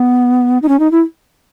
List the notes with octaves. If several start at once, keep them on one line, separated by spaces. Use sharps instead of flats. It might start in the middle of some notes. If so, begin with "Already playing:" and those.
Already playing: B3
D#4
C#4
D#4
E4